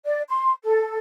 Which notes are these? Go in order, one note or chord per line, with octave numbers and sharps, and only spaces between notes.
D5
C6
A4